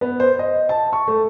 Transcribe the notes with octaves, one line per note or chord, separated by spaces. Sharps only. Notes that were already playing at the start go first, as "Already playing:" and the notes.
B3
C5
D#5
A5
C#6
A3